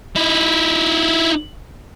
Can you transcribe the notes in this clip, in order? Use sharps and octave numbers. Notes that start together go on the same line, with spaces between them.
D#4 E4